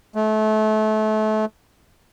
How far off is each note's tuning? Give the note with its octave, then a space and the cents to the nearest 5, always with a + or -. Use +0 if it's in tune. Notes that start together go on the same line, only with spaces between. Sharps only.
A3 -30